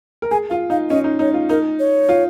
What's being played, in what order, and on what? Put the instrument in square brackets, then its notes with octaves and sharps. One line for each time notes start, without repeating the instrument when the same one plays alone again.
[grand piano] A#4
[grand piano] G#4 [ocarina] G#5
[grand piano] F4 [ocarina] F5
[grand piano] D#4 [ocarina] F5
[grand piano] C#4 [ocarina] D#5
[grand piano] D#4
[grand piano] D#4 [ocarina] C#5
[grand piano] F4
[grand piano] D#4 [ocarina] A#4
[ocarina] C#5
[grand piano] F4